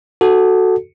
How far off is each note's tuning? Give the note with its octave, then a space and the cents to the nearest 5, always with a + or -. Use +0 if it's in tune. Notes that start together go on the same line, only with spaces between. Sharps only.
F#4 +0 A4 +0